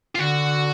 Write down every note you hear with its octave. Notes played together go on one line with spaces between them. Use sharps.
F4
D3 F#4